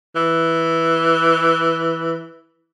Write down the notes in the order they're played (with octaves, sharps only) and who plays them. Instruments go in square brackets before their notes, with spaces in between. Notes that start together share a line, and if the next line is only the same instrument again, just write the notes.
[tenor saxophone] E3